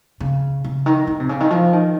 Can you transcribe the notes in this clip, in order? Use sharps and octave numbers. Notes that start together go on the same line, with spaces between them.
C#3
C#3
D#3
D#3
C3
C#3
D#3
F3
D#3